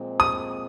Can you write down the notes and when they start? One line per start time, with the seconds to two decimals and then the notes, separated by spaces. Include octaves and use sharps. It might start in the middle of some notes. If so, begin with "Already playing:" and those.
Already playing: A#2 F3 G#3 C4
0.20 D#6